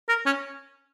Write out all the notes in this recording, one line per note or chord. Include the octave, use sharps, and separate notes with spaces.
A#4
C#4